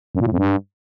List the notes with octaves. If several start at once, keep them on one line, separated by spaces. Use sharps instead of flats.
F#2
A#2
A2
F2
G2